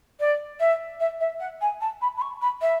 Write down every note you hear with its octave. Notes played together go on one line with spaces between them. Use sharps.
D5
E5
E5
E5
F#5
G#5
A5
B5
B5
C#6
B5
E5